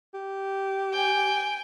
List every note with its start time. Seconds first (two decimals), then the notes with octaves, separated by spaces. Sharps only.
0.14 G4
0.93 G5 G#5